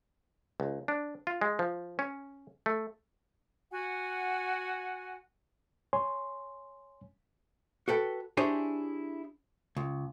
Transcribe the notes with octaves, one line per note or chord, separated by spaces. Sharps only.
C#2
D4
F4
G#3
F3
C#4
A3
F#4 F#5 G#5
C#5 G#5 C6
F#4 A4 B4 G5
D4 E4 G4 G#4 C5 C#5
C#2